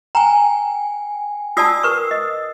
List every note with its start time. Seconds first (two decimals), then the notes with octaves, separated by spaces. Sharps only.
0.15 G5 G#5 A#5
1.57 F4 D5 A5 D#6 E6 C7
1.83 A#4 B4 C#6
2.11 D#5